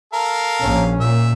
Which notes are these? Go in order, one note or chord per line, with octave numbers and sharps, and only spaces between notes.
A4 A#4 F5
A#1 C#4
A#2 E5